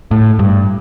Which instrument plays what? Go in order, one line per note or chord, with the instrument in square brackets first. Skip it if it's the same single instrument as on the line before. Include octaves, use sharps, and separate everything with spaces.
[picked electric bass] A2
G2